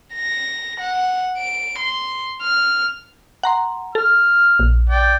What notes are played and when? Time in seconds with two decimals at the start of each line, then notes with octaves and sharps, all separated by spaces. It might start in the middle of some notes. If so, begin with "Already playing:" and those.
0.14 A#6
0.80 F#5
1.38 D7
1.79 C6
2.41 F6
3.43 F#5 A#5 C6
3.95 A4 F6
4.60 A#1
4.89 D5 G5